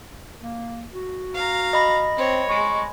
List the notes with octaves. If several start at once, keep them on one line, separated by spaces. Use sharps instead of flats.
A#3
F#4
F5 A#5
D#5 B5 A#6
C4 C#5
G#3 C#6